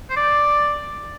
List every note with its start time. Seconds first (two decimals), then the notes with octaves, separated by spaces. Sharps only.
0.10 C5
0.17 D5